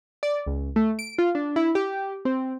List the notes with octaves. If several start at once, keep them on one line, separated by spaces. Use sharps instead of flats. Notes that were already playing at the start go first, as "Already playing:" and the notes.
D5
C#2
A3
D7
F4
D4
E4
G4
C4